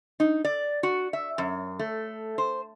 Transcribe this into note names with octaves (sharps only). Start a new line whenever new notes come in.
D#4
D5
F#4
E5
F#2
A3
C5